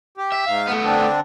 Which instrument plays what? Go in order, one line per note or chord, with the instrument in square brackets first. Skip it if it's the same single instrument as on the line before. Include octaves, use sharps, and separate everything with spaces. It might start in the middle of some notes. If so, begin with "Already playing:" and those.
[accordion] G4
[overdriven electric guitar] E5
[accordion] G#2 F5
[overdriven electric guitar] A3 B3
[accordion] D3 C4 D4